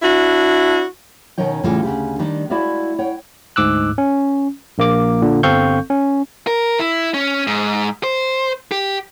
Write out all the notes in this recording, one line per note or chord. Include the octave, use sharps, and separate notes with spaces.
D4 E4 F#4
B2 D#3 C#4 D#4 C#5 G5
A2 C#3 E3 G3 F4
D2 G2 C#3 G4
D#3 G3 D4 D#4
G#3 E4 F#4 D5 E5 F5
C#5 F#5 G5
D2 G#2 D6 E6 F#6
C#4
A#1 A#3 D6
A#2 D3
G1 C4 A4 F5 C#6 G6
C#4
A#4
E4
C#4
G#2
C5
G4